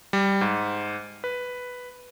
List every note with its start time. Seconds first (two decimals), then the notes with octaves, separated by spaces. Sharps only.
0.13 G3
0.41 G#2
1.24 B4